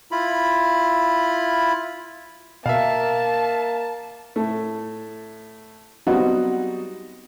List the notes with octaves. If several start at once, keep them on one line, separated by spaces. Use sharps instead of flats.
E4 F4 B5
B2 A#3 E5 F5 A5
A2 A3
F#3 G3 B3 C4 D#4 F#4